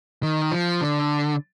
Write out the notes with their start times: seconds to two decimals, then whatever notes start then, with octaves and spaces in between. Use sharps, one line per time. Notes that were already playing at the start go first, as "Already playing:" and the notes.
0.23 D#3
0.51 F3
0.81 D3